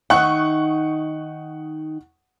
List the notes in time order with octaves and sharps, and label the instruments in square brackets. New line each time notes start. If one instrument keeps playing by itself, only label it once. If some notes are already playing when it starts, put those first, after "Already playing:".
[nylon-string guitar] D#3 D#4 E5 [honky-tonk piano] F#5 C#6 F#6